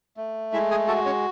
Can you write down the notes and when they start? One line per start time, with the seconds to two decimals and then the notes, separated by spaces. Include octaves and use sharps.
0.17 A3
0.53 G#3 E4 E5
0.71 G#4 G#5
0.87 F#4 A4 A5
1.05 C#4 C#5